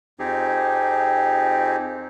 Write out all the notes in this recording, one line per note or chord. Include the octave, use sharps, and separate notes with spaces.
F2 F3 C4 D#4 G4 G#4